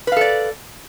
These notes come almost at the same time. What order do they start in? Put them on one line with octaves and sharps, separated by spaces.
B4 F5 A4 D5